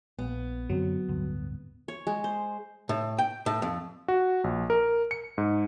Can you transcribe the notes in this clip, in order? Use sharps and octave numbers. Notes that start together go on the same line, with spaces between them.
A#1 B3
F#2 D3 F#3 C4
D1 G2 D3
C#5
G#3
C5
A2
G5
A2
F2
F#4
A#1
A#4
C#7
G#2